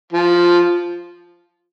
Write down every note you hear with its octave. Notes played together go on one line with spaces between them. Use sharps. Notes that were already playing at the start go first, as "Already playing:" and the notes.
F3